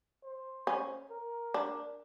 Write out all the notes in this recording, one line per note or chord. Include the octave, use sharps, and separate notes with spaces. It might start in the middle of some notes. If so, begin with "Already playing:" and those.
C5
C#4
A#4
D4